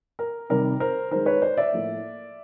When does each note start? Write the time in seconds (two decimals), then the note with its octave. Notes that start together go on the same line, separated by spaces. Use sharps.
0.19 A#4
0.50 C3 D#3 G3 A#4
0.80 A#4 C5
1.11 D#3 G#3 A#4 C5
1.26 B4 C#5
1.42 C5 D5
1.57 D5 E5
1.72 A2 F3 A#3